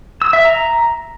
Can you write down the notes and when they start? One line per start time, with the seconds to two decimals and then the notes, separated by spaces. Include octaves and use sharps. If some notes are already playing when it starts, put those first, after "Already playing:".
0.22 E6
0.33 E5
0.45 A#5